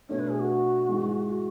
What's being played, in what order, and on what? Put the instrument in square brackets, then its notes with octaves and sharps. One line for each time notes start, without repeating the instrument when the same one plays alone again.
[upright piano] B2 A3 D4 [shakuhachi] C#5
[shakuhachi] B4
G#4
F#4
[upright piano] G#2 E3 G#3
[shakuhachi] F#4